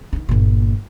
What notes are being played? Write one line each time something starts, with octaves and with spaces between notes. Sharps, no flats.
D4 D#4
G1 A#2